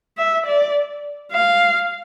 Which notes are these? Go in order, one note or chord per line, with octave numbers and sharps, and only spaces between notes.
E5
D5
F5